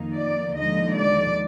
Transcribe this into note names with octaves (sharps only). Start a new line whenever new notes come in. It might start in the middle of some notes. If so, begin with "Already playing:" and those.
Already playing: F2 D#3 A#3 D#4
D5
D#2 D3 F3 G#3 D#4 D#5
D5